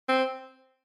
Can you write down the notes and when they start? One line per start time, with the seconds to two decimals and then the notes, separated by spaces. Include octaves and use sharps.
0.09 C4